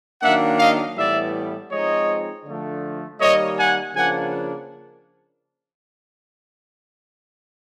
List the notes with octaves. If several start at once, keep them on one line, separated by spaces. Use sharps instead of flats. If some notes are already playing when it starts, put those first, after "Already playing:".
D#3 F#3 A#3 D4 E5 F#5
D#5 F5
A2 E3 G3 B3 D5 E5
F3 G#3 C4 D#4 C#5 D#5
D3 F3 A3
D#3 G3 A#3 C#5 D#5
F#5 G#5
C#3 F3 A#3 D4 F#5 G#5